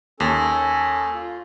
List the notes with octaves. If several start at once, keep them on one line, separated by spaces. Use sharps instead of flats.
D#2 C#4 A4
F4